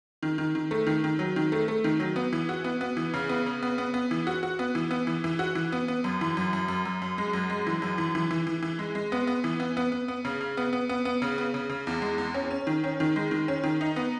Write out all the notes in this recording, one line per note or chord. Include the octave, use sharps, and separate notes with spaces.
D#3
D#3
D#3
A3
D#3
D#3
F#3
D#3
A3
A3
D#3
F#3
B3
E3
F#4
B3
B3
E3
C#3
B3
C#3
B3
B3
B3
E3
F#4
F#4
B3
E3
B3
E3
E3
F#4
E3
B3
B3
F#2
E3
F#2
F#2
F#2
F#2
F#2
G#3
F#2
G#3
E3
F#2
E3
E3
E3
E3
E3
G#3
G#3
B3
B3
E3
B3
B3
B3
B3
C#3
C#3
B3
B3
B3
B3
C#3
B3
C#3
C#3
E2
G#3
E2
C#4
C#4
D#3
C#4
D#3
G#3
D#3
C#4
D#3
D#4
B3